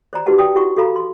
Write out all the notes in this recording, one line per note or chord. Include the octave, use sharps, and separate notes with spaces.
C5 D5 A#5
D#4 F#4 G4 B4 F#5 A5
D5 G5 D#6
E4 F#4 F#5 C#6
F#4 A4 F5 A#5 B5
C6